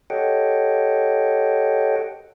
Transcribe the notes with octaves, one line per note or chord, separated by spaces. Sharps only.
G4 A4 C#5 D#5 F#5 G5